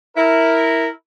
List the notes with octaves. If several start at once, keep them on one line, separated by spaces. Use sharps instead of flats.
E4 A#4